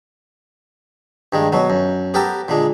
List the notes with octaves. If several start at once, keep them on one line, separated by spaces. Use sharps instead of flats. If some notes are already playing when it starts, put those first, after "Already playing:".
G2 D#3 G#3
B2 F#3
F#2
B3 G4 A4 A#4 A5
A#2 D3 G#3